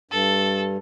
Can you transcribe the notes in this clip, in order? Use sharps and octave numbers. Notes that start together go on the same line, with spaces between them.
G2 A4